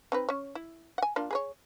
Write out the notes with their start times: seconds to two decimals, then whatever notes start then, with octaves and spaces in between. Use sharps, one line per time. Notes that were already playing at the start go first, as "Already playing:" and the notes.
0.12 C4 D#4 B4
0.29 C#4 C#5
0.55 E4
0.98 F#5 G#5
1.16 A#3 D4 F4
1.31 G#4 B4 C#5